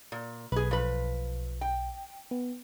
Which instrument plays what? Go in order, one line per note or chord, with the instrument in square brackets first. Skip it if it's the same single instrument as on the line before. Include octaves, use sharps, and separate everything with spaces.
[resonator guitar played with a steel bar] A#2
[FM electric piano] B1 [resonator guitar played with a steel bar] G#4 B4
[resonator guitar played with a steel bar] F3 B4
G5
[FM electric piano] B3